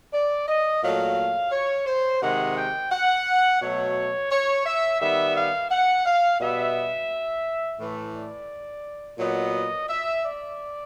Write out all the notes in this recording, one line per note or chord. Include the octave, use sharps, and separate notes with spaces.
D5
D#5
A#2 F#3 A3 F5
C#5
C5
C3 D#3 G#3 F#5
G5
F#5
B2 F#3 A3 C#5
C#5
E5
D#3 G3 B3 E5
F5
F#5
F5
B2 G3 B3 E5
A2 E3 A3
D5
A#2 F#3 B3 D#5
E5
D5